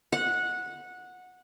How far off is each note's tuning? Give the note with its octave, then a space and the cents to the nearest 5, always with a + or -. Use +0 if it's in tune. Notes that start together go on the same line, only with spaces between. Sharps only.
F#5 -15